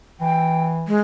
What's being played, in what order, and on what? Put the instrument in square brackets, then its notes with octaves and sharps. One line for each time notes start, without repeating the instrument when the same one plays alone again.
[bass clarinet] E3 [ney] G5
[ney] G#3